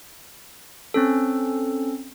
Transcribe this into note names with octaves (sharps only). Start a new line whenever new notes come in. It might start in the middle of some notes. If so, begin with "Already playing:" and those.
C4 C#4 A4